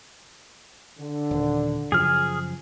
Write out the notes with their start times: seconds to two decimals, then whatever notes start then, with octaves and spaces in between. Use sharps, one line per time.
0.99 D3
1.31 D#1
1.92 F#2 C#3 F3 G#4 F6